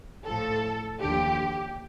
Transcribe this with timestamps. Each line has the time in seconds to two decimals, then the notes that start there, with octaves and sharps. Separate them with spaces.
0.25 A2 F3 A4
1.02 D#2 D3 F3 G4